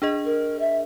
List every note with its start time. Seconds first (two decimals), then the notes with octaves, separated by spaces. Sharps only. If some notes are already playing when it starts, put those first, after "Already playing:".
0.02 D4 G#4 D#5
0.25 A#4
0.59 E5